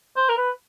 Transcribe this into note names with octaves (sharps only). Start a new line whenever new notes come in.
C5
A#4
B4